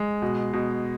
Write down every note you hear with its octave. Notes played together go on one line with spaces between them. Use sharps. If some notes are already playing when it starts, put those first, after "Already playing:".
Already playing: G#3
B2
B2